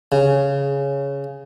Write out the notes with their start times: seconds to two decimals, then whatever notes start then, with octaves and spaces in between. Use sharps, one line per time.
0.12 C#3